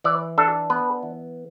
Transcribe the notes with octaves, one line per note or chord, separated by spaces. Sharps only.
E3 D5
D4 A4
B3 B4
E3